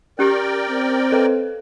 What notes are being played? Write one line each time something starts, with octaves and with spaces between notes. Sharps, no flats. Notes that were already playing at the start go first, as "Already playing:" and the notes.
C#4 G4 A#4 D5 G5
C4
A4 B4